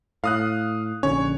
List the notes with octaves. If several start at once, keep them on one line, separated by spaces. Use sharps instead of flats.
A2 F5 D#6 F#6
A#1 D3 C#4 C#5